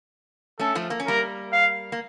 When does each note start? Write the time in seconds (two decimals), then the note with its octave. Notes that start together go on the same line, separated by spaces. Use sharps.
0.59 A3 C#4 A4
0.75 F3 A3
0.90 A#3
1.00 C#4
1.07 G3 A#3 A#4
1.53 F5
1.92 A#3